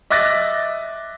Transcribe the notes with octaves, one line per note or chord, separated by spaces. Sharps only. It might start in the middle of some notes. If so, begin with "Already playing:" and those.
D#5 E5 D6 F#6 A6 A#6